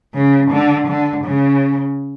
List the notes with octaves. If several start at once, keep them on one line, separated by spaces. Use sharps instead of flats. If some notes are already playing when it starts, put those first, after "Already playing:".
C#3
D3
D3
C#3